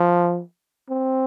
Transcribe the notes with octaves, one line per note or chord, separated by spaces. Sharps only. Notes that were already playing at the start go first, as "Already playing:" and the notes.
Already playing: F3
C4